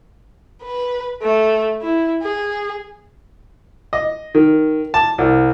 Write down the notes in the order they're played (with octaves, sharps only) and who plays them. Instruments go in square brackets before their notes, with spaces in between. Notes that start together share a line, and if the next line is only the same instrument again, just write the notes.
[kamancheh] B4
A3
E4
G#4
[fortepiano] D#5
D#3
A5
C2